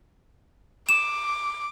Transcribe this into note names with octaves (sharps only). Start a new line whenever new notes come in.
D6 E7